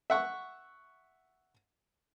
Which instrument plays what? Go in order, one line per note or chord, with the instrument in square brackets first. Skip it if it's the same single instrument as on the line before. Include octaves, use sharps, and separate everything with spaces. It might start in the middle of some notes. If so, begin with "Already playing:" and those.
[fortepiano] E5 F#5 C#6